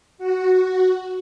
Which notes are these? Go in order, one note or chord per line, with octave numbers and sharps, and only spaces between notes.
F#4